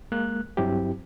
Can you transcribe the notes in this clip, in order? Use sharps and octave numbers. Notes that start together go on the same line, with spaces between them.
G#3 A#3 F#6
G2 F#3 C4 E4 G4